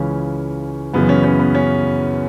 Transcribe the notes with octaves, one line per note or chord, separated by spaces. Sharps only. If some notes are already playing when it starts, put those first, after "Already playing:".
Already playing: C#2 C#3 E3 C#4
F#2 C#3 E3 B3
C#4
C#4
B3
C#4